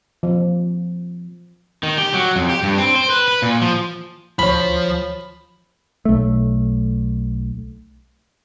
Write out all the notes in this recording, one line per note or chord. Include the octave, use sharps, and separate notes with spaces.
F3
D#3
G4
F#3
F2
G4
G2
C4
C5
B4
B4
A#2
F3
D2 F3 C#5 B5
B1 A3